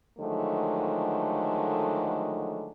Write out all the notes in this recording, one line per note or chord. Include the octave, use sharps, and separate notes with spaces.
D3 D#3 F3 F#3 G#3 A3